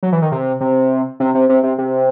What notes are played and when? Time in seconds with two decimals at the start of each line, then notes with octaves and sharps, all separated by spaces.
0.03 F#3
0.12 E3
0.22 D#3
0.32 C3
0.61 C3
1.20 C3
1.35 C3
1.49 C3
1.63 C3
1.78 C3